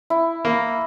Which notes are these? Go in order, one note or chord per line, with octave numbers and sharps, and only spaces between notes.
E4
A#3